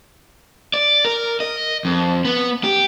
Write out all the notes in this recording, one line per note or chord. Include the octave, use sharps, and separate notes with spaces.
D5
A#4
D#5
F2
B3
G4